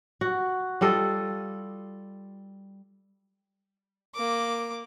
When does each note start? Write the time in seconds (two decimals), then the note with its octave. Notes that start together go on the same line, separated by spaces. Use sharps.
0.21 F#4
0.81 G3 F4 A4 D#5
4.15 A#3 D6